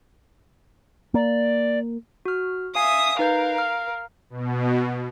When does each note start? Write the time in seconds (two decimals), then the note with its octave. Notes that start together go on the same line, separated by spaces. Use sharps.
1.14 A#3 D5
2.25 F#4 F6
2.75 E5 F5 G#5 D#6 C7
3.19 D#4 A#4 B4 F5 G6
3.58 F6
4.30 B2